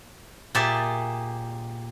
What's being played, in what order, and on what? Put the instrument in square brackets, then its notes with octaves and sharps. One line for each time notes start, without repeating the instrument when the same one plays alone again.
[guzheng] A#2 G4 G#4 E5 A5